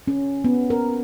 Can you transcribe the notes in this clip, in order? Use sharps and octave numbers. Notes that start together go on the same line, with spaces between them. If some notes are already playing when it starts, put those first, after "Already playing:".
C#4
B3
A#4